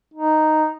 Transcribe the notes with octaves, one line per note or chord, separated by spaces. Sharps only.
D#4